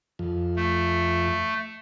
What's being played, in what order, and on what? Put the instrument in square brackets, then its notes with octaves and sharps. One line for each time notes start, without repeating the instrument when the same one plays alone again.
[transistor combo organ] F2
[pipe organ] A3